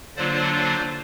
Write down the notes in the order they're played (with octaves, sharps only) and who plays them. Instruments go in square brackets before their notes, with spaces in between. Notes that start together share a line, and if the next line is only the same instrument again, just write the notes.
[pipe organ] D3 F#3 A#3 D4 F4 C5 D5